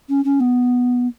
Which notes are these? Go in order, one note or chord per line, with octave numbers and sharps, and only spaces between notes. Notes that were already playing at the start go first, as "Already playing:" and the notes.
C#4
C#4
B3